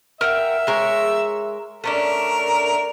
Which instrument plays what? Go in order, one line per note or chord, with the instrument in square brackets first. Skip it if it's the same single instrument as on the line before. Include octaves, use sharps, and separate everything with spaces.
[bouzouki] A#4 F#5 G5 [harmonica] E5
[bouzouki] G#3 A#4 C#5
[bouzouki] A3 C#4 D4 [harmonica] A#4